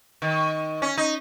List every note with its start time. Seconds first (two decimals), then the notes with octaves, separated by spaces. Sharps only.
0.22 D#3
0.82 C#4
0.98 D#4